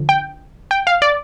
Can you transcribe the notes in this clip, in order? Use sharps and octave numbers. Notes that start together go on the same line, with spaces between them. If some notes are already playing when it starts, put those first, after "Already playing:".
Already playing: D3 F3
G5
G5
F5
D5